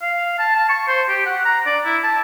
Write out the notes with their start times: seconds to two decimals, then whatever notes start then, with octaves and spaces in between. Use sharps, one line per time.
0.02 F5
0.39 A5
0.55 A5
0.69 C#6
0.88 C5
1.09 G4
1.26 F#5
1.45 A#5
1.66 D5
1.85 E4
2.04 A5